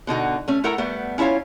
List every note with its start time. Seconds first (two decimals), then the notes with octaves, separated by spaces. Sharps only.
0.07 B2 D3 D#4 F#4
0.48 A3 C#4
0.64 A3 E4 A4 A#4 F#5 A#5
0.78 G3 A3 B3
1.18 C#4 E4 F4 C#5 F5